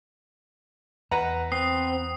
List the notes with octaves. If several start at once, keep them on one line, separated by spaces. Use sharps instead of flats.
E2 B4 F#5 A#5
C4 D#6 C7